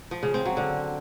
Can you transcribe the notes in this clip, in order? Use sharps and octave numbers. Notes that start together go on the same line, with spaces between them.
F3
C#3
C4
F#3
D3